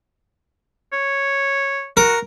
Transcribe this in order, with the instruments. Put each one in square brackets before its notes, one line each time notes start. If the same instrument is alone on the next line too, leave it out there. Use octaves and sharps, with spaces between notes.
[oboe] C#5
[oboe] F#4 [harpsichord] A#4